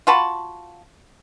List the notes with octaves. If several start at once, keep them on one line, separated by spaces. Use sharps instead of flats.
F4 F#4 A5 B5